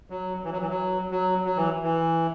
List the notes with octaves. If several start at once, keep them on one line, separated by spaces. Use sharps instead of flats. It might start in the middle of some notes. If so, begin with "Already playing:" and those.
F#3
E3
F#3
E3
F#3
F#3
F#3
E3
E3